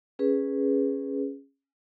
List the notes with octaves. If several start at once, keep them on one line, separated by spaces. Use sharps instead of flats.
C#4 G#4 B4